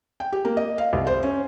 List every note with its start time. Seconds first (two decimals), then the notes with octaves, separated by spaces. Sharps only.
0.20 G5
0.32 G4
0.45 A#3
0.57 D#5
0.78 F5
0.93 C2
1.07 C5
1.23 C#4